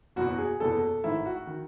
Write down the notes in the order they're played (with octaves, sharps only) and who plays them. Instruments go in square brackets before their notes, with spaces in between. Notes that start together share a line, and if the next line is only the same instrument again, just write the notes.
[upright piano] F#1 E2 B2 F#4
G#4
F#1 E2 B2 A4
A1 G#2 D#3 E4
F#4
D#3